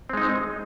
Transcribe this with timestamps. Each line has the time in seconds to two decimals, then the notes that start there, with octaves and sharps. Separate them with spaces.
0.09 C4
0.13 G#3
0.17 D#4